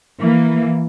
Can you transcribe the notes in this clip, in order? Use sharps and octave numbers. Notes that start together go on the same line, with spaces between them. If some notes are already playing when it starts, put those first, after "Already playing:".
E3 A#3